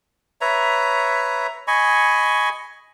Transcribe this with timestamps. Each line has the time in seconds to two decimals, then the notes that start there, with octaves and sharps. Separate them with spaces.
0.41 B4 C#5 E5 A#5
1.68 D#5 G#5 B5 C#6